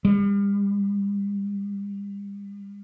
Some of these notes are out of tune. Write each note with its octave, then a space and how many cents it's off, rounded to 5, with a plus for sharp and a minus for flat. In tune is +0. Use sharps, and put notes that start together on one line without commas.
G3 +40